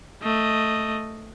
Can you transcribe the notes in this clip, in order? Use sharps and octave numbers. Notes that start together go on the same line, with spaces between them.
A3 D#5